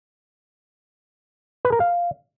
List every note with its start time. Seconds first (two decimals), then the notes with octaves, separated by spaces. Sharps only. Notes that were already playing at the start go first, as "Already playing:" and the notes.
1.65 B4
1.72 A#4
1.80 F5